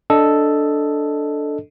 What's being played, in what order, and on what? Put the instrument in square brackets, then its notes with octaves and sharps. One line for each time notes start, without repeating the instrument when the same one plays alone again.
[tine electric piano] D4 A4 D#5